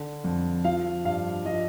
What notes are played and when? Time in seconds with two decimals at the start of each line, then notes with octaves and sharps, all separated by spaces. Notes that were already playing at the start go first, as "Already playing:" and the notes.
Already playing: D3
0.24 F2
0.64 F3 F5
1.05 G2 F5
1.45 F3 D#5